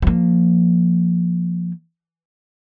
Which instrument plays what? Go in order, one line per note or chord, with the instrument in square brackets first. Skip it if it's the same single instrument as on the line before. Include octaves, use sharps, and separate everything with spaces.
[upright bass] F3 A#3